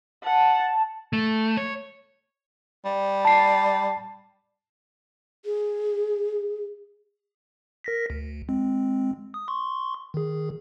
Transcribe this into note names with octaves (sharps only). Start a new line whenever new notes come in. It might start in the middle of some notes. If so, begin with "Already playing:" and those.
F#5 A5
A3
C#5
G3
A5 C7
G#4
A#4 A#6 B6
D2
G#3 C4
D#6
C6 C#6
D#3 G#4